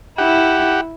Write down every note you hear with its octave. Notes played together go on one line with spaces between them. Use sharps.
E4 G4 F#5